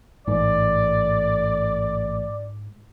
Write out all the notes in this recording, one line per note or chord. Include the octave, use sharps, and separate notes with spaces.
A1 G#2 D5